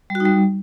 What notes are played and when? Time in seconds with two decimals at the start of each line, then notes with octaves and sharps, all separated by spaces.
0.10 G3
0.15 F#4
0.20 D#4
0.25 G3